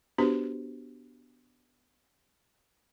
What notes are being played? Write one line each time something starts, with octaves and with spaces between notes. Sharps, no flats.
B3 D4 F#4 G4 B4 C5